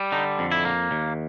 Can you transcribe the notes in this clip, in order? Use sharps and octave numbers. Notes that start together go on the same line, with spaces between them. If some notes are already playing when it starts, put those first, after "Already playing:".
Already playing: G3
D3 D#4
F2
E4
A#3
D#2